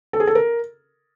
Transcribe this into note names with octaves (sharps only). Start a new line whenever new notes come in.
A4
G#4
A4
A#4